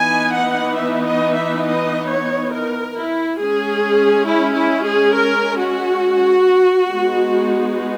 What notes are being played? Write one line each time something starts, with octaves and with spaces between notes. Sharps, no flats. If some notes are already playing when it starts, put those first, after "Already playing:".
Already playing: E3 B3 D#4 G#5
F#5
E5
D#5
E5
D#5
C#5
A#4
E4
G#3 C#4 G#4
E4
E4
G#4
A#4
F#4
G#3 B3 D#4